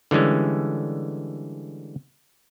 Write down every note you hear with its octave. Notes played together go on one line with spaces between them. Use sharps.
D3 E3 G3 G#3 C#4